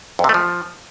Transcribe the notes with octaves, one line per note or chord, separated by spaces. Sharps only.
F2
C3
A3
F3